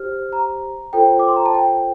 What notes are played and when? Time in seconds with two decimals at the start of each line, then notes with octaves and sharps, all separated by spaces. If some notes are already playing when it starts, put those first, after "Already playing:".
Already playing: G4 C5 F6
0.33 A#5
0.93 F4 A4 C5 G5
1.19 D6
1.28 C6
1.36 A#5
1.46 A5
1.55 G5